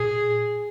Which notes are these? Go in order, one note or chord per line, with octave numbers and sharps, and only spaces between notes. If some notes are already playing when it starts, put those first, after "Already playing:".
Already playing: A#2 G#4